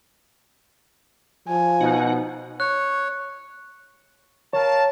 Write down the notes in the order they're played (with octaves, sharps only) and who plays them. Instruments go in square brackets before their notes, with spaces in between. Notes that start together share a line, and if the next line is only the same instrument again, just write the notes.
[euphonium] F3 [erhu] G#5
[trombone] B2 [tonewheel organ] D#4 F#5
[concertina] C#5 [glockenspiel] F#6
[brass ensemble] A#4 F5 A5 [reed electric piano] C#5